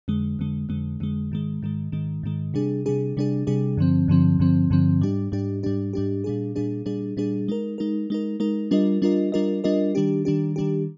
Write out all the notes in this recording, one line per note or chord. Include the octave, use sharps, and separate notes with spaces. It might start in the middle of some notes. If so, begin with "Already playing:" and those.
F2 D3 G#3
F2 D3 G#3
F2 D3 G#3
F2 D3 G#3
G#2 D#3 G#3
G#2 D#3 G#3
G#2 D#3 G#3
G#2 D#3 G#3
C3 G3 D4 G#4
C3 G3 D4 G#4
C3 G3 D4 G#4
C3 G3 D4 G#4
G2 D3 F3 C4
G2 D3 F3 C4
G2 D3 F3 C4
G2 D3 F3 C4
G#2 G3 D4 G4
G#2 G3 D4 G4
G#2 G3 D4 G4
G#2 G3 D4 G4
A#2 G3 D4 G#4
A#2 G3 D4 G#4
A#2 G3 D4 G#4
A#2 G3 D4 G#4
G#3 D#4 A#4
G#3 D#4 A#4
G#3 D#4 A#4
G#3 D#4 A#4
G3 D4 F4 A#4 D#5
G3 D4 F4 A#4 D#5
G3 D4 F4 A#4 D#5
G3 D4 F4 A#4 D#5
D#3 G3 D4 G4
D#3 G3 D4 G4
D#3 G3 D4 G4